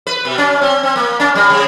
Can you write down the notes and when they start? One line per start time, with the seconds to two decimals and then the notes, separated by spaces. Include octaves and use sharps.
0.07 B4
0.25 B2
0.38 C#4
0.61 C4
0.83 C4
0.96 A#3
1.20 C#4
1.35 G3
1.50 C3